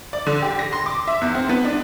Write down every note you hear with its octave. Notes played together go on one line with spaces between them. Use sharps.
D5
D3
G4
A#6
C6
D6
E5
E2
C4
B3
D4